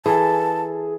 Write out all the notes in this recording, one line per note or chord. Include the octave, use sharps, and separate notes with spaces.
E3 G#4 A4 A5